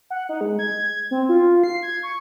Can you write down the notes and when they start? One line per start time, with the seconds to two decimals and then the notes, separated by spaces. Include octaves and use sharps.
0.10 F#5
0.29 D#4
0.41 G#3
0.59 G#6
1.11 C4
1.29 F4
1.64 C7
1.82 G#6
2.03 C#6